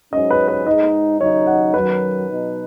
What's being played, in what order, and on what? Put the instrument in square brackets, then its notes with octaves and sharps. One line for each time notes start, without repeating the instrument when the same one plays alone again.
[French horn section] G#2 F#3 C#4 [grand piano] D#5
[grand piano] B4
B4
[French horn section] G#2 G#3 D#4 [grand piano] D#5
[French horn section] D#2 C#3 F#3 D#4 [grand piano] C#5
[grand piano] F#5
[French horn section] F#2 D#3 F#3 [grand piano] B4
[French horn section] B2 F#3 D#4